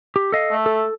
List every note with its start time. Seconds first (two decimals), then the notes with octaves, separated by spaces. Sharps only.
0.16 G4
0.32 A4 D#5 F5
0.51 A3
0.66 A4